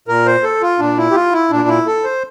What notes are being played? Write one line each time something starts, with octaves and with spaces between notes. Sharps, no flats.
A#2 A#4
C5
A4
F4
A#2 D4
E4
G4
F4
E4
A#2 D4
E4
A4
C5